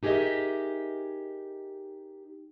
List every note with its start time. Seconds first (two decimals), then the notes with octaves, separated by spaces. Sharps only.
0.03 D#4 G4 G#4 A#4 D#5 E5